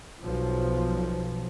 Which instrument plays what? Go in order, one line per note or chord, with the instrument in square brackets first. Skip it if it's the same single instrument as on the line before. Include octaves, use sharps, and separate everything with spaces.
[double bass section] B1 F3